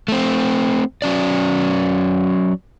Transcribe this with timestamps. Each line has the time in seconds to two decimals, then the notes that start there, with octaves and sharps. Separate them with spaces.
0.08 A3 C4
1.02 F#3 C#4 D5